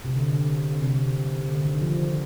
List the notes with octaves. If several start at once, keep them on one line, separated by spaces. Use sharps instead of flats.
C3
D3
C3
D3
D#3
F3